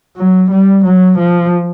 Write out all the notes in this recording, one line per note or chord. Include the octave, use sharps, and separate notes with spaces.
F#3
G3
F#3
F3